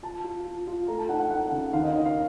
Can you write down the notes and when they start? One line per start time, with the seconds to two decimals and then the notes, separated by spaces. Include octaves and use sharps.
0.03 F4 A5
0.24 F4
0.45 F4
0.67 F4
0.87 A3 A#5
0.99 A5
1.09 D#4 F#5
1.19 F#5
1.30 D#4 F#5
1.52 C#3
1.73 D#2 F5
1.83 D#5
1.94 D#3 D#5
2.05 F5